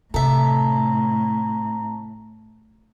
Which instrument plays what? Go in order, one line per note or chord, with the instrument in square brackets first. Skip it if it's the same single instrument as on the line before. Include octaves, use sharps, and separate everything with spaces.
[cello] A2 [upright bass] C3 [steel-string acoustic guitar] A4 E5 [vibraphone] A5 A#5